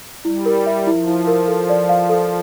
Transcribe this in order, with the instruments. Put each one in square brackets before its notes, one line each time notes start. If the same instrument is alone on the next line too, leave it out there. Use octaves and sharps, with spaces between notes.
[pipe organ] G3 [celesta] E4
[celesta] A#4
E5
[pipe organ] F3 [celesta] E4
[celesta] E4
A#4
A4
D5
F5
A4